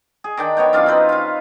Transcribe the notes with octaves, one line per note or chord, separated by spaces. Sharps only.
G#4
D#3 D4 G5
D#3 B3 C#5 G5
F#2 D4 F4 F5
C4 D#4 B4 C5
F4 F5